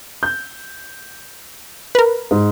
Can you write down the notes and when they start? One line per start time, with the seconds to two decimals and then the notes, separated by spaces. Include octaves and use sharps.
0.23 G6
1.95 A#4 B4
2.31 G#2